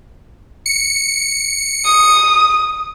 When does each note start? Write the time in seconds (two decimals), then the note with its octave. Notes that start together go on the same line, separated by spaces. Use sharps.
0.66 C#7
1.85 D#6